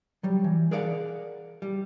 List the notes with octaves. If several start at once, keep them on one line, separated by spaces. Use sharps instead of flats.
F#3 G3
E3
G#4 A#4 D5 F5 F#5
G3